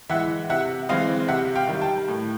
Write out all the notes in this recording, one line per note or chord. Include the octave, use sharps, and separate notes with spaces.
E3 G#3 E5 F#5
C3 E5 F#5
E3 G#3 C4 D#5 F5
C3 E5 F#5
F5 G5
D#3 G3
G5 A5
A2